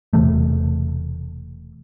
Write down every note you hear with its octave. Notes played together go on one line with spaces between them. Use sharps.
E1 C3 E3 A3